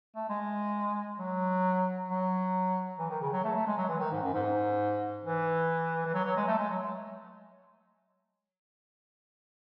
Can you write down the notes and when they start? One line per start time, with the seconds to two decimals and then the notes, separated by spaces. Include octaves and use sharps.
0.15 A3
0.29 G#3
1.19 F#3
2.09 F#3
2.99 E3
3.10 D#3
3.21 C#3
3.33 F#3
3.44 A3
3.55 A3
3.66 G#3
3.77 F#3
3.88 E3
4.00 D#3
4.11 G#2
4.22 F#2
4.34 G#2
5.24 E3
6.06 E3
6.14 F#3
6.25 F#3
6.36 G#3
6.48 A3
6.59 G#3
6.70 F#3